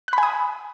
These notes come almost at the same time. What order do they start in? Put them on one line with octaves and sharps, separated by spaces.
F#6 B5 G#5 D#6